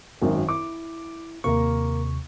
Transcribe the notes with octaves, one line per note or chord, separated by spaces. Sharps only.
G#1 F#2 D#3
E4 D6
D#2 C3 A#3 A#4 C#6